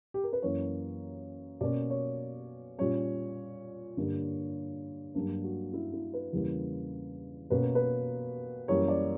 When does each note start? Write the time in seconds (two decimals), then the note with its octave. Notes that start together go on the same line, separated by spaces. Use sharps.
0.14 G4
0.24 A#4
0.33 B4
0.42 F#2 E3 A#3 C#4 C#5
1.61 B2 A#3 C#4 D5
1.90 C#5
2.78 A#2 G3 C#4 C#5
3.97 G2 D3 G3 A#3
5.15 G2 F#3 A#3 D4
5.44 F#4
5.73 E4
5.93 E4
6.14 B4
6.33 E2 C#3 E3 G3 A#3
7.50 B2 A#3 C#4 B4
7.63 A#4
7.75 B4
8.68 F#2 E3 G3 A#3 C#4 C#5
8.88 D5